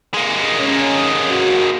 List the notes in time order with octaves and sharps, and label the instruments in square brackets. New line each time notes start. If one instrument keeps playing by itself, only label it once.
[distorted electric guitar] G#3 A#3
[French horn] C#4
F#4